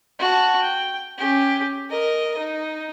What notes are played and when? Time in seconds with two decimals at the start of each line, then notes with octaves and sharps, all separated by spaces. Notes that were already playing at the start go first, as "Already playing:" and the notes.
0.19 F#4 A5
0.62 G5
1.18 C#4 G4
1.90 A#4 D#5
2.38 D#4